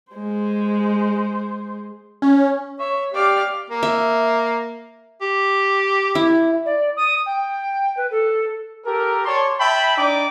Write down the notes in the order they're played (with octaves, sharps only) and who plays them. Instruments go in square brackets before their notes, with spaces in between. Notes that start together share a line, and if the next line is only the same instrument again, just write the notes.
[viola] G#3 C5
[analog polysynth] C#4
[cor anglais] C#5 [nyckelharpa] E5
[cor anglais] G4 [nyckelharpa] D5 F5
[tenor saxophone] A#3
[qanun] E5
[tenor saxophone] G4
[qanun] E4
[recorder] D5
D#6
G5
B4
A4
[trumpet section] G4 A4 A#4
C#5 D5 A5 C6 C#6
E5 G5 A5 B5
D4 D#4 D5 G5 D6